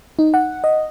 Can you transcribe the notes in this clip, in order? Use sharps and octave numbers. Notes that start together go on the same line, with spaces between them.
D#4
F#5
D#5